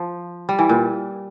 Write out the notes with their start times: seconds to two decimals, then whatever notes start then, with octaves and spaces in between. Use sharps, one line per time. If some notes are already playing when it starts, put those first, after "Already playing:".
Already playing: F3
0.49 G3
0.59 E3
0.69 A#2